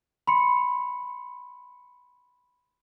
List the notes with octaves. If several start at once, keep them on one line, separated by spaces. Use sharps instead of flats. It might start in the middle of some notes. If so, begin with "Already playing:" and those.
B5 C6 C#7